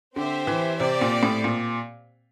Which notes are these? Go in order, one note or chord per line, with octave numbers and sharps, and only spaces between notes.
D3 C4 G4 C5 E5
E3
C3 C4 G4 D5
A#2
A2
A#2